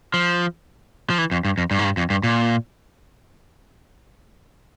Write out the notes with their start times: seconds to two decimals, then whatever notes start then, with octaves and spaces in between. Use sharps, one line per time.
0.14 F3
1.10 F3
1.18 E3
1.31 F2
1.45 G2
1.58 F2
1.71 G2
1.79 G#2
1.84 G2
1.97 F2
2.10 G2
2.23 A#2